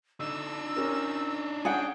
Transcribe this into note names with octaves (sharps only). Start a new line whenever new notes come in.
D3 D4 D#4 E6
C#4 G4 A#4
C#4 G#4 F#5 G5